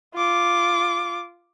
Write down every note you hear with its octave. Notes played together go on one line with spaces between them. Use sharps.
F4 D6